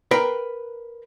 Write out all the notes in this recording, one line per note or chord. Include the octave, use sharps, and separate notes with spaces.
A#4 B4 F5 G5 A#5